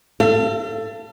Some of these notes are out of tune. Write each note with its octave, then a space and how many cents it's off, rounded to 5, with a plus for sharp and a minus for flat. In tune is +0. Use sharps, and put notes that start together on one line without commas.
A4 +15 F5 -40